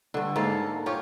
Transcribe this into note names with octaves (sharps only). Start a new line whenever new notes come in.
G2 D3
G#2 A#3 A4 F5
F4 G4 C#5